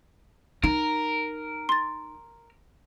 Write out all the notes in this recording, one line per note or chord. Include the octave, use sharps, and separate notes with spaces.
D#4 A#4
C6 A6